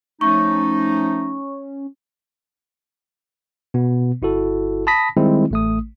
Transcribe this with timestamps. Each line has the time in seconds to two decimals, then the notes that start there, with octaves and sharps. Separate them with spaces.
0.21 F3 A3 C#4 D#4 C#6
3.74 B2 B3
4.22 G1 E4 F#4 A4
4.87 A5 B5 D#6 A#6 B6
5.17 D#3 G3 G#3 C4 E4
5.51 A1 A3 D#6